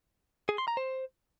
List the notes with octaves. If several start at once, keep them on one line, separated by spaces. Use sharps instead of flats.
G#4
C6
A#5
C5